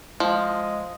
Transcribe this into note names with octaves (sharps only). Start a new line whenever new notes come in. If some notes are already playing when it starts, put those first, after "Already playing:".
F3 G#3 D#5